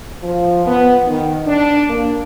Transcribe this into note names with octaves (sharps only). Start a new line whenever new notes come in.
F3
B3
D#3
D4
A#3